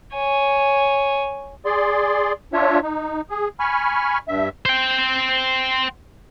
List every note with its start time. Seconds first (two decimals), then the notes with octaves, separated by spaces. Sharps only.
0.14 C#5 G#5
1.65 G#4 D5 C6
2.53 D4 F4 C#5 E5
2.83 D#4
3.30 G#4
3.60 G#5 B5 C#6 F6
4.28 G2 E5
4.66 C5 G5